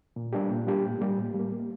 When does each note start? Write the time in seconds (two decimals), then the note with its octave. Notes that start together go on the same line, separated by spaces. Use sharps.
0.16 A#2
0.33 G3 A#3 D4 G4
0.51 A#2
0.67 G3 A#3 D4 G4
0.84 A2
1.01 G3 A#3
1.18 A2
1.34 G3
1.39 A#3
1.52 A#3